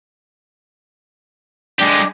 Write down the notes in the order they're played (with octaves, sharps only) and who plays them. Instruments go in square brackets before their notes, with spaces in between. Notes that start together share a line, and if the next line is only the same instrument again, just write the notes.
[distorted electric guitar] G#3 G4 [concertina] D4